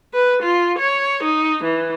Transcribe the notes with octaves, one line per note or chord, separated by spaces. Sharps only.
B4
F4
C#5
D#4
E3